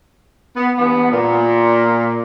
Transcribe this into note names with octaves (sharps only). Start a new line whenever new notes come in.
B3
E2 G2 B3
A#2